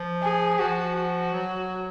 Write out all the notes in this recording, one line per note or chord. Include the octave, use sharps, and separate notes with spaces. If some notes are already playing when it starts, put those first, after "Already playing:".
Already playing: F3
G#4
F3 F#4
F#4
F#3